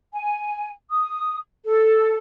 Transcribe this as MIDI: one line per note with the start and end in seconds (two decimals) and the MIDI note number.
0.13 0.70 80
0.90 1.36 87
1.66 2.16 69